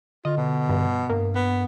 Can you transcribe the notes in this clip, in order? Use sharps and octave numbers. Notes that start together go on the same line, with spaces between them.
D3 F4 D#5
B2
G2
G2 A#3
B3